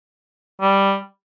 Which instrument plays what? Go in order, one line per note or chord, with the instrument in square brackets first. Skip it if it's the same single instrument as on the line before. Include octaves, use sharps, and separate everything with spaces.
[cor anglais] G3